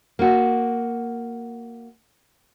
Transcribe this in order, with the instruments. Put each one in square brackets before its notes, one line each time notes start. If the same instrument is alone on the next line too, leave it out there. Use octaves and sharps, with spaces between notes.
[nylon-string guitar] A#3 F#4